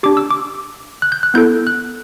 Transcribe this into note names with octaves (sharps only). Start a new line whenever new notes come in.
D4 G4 D6
E6
D6
F#6
G6
F#6
B3 E4 A4 G6
F#6